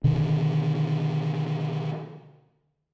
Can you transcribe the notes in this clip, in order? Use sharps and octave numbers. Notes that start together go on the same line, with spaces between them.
B2 D3 D#3